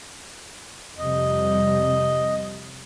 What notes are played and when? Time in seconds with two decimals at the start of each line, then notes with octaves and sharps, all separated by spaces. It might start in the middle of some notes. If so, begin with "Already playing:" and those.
0.99 F2 C3 G3 D#5